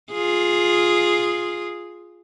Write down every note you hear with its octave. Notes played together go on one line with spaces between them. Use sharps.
F4 G#4